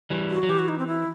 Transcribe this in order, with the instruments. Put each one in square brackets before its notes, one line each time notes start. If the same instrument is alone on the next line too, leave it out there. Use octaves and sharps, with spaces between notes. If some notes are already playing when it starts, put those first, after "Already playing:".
[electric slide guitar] E3 G3
[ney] F#4
[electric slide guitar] F#3
[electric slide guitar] E3 [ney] G4
[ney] F#4
D#4
C4
E4